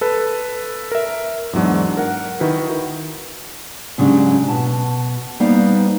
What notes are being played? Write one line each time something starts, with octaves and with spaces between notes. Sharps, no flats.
A4 B4
A#4 E5
E2 G#2 F#3 D4
A#4 F#5
D#3 E4 F#4 B4
G#2 C#3 F#3 G#3 D4 G4
B2 A5
G3 A#3 B3 D#4 C5 F5